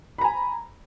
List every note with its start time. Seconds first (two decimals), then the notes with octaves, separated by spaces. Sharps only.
0.18 B5
0.21 A#5
0.24 G#5